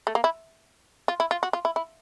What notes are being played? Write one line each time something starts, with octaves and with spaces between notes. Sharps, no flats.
A3
A#3
E4
F4
E4
F4
F#4
F4
E4
E4